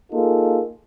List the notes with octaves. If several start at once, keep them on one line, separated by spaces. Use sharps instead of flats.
A#3 D#4 F4 G#4 A4